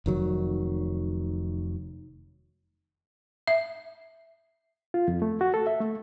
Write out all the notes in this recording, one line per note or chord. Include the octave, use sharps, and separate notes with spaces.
F1 D#3 F#3
E5
F4
F2
A3
F#4
A4
E5
A3